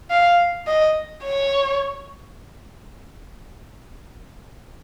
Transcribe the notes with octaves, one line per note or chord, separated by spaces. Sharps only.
F5
D#5
C#5